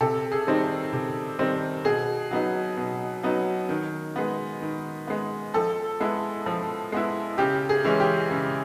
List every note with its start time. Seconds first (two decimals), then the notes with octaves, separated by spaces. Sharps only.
0.01 C3 A4
0.32 G#4
0.47 D#3 G3 C4 D#4
0.93 C3
1.39 D#3 G3 C4 D#4
1.85 B2 G#4
2.31 F#3 B3 D#4
2.77 B2
3.23 F#3 B3 D#4
3.69 D#3
4.16 G#3 B3
4.62 D#3
5.07 G#3 B3
5.54 F3 A4
6.00 G#3 B3 E4
6.46 F3
6.92 G#3 B3 E4
7.38 C#3 G4
7.69 G#4
7.84 E3 G#3 C#4 E4
8.00 G4
8.30 C#3